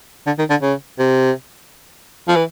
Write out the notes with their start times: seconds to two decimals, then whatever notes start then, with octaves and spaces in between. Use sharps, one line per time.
0.26 D3
0.38 D#3
0.50 D3
0.62 C#3
0.99 C3
2.28 F3
2.36 E3